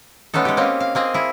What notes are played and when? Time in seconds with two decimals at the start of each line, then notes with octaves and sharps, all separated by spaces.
0.34 G#3 A3 B3 C#4 D#4 A4
0.45 G#3 G4
0.57 A#3 C4 C#4 D#4
0.80 F5
0.95 A#3 C4 G#4 D#5
1.14 E4 G#4